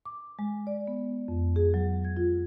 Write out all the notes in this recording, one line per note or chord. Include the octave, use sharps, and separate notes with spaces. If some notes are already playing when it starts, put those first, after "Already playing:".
D6
G#3
D5
B3
F2
G#4
F#3
G#6
F4